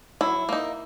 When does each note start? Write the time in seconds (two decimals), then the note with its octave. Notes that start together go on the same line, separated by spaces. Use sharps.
0.21 F#3 E4
0.49 A#3 D#4